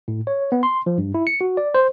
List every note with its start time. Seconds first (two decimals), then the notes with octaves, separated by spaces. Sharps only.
0.08 A2
0.27 C#5
0.52 B3
0.63 C6
0.86 F3
0.98 G2
1.14 E4
1.27 C#7
1.41 F#4
1.57 D5
1.74 C5